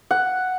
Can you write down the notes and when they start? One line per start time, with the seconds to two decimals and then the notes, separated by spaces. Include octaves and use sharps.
0.11 F#5